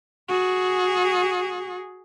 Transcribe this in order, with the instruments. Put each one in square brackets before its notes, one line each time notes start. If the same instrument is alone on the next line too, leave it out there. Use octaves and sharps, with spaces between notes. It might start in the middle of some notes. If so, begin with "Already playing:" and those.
[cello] F#4 G#4